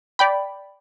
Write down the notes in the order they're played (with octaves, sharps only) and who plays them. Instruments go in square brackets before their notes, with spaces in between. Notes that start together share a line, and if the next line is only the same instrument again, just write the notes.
[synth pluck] D5 G5 B5